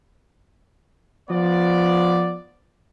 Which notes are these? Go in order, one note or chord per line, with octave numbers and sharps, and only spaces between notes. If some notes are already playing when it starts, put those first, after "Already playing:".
F3 B3 D5